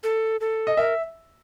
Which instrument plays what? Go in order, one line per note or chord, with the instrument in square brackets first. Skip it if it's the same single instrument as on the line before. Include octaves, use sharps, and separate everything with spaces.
[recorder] A4
A4
[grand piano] D#5
[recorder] A#4 [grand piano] E5